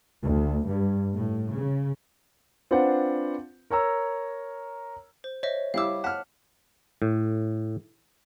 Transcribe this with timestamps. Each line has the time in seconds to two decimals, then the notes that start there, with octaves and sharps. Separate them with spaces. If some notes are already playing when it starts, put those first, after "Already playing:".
0.23 D2
0.65 G2
1.15 A2
1.51 C#3
2.71 C4 D4 F4 B4 C5 F#5
3.70 A#4 C#5 A#5 E6
5.24 C5
5.43 C5 C#5 D#5 E5
5.74 G3 E4 F5 D6 E6
6.04 F#5 A5 F6 B6
7.02 A2